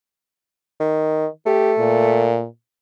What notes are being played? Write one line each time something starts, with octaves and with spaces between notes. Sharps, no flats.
D#3
A3 G4
A#2